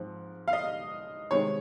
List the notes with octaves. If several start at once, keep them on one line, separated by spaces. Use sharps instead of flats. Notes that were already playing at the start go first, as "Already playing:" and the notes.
Already playing: G#2 F3 C4
F5
D#5
C3 D#3 G#3 C4 C#5